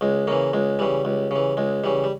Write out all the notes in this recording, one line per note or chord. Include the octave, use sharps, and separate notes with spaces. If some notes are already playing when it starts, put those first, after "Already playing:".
C#2 G#3
C#3 E3 A#3
C#2 G#3
C#3 E3 G3
C#2
C#3 E3
C#2 G#3
C#3 E3 G3
G3